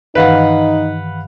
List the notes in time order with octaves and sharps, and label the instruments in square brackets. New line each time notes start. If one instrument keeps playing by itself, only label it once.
[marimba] G2 D#3 E3 [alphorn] D#4 [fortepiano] B4 F5 F#5